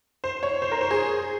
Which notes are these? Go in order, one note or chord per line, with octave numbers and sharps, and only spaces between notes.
C5
C#5
C5
A#4
C5
G#4